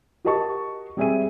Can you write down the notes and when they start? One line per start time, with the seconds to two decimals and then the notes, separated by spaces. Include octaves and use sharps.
0.24 F#4 G4 A#4 D#5 A5 C#6
0.97 G3 C4 G#4 E5 G#5 D#7